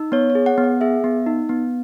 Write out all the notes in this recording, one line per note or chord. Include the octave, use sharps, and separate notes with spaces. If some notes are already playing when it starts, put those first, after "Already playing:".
Already playing: D#4
B3 C#5
C#5
G#4
F#5
B3
F#5
G#4 E5
B3
D#4
B3